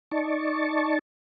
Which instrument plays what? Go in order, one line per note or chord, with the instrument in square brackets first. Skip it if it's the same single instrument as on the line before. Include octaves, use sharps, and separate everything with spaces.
[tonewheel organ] D#4 D5 A5 C#6